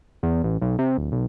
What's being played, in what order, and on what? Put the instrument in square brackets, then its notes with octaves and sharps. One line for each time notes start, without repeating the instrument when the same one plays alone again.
[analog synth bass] E2
A1
B1
C3
D1
B1